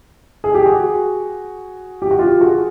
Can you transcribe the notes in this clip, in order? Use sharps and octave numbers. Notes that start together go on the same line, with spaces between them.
G#4
G4
F#4 G#4
G4
F#4
F4 G4
F#4 G#4